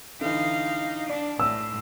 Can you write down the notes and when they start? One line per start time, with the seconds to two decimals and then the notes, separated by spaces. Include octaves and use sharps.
0.21 D3 E3 D#4 F5
1.09 D4 D5
1.40 A2 E6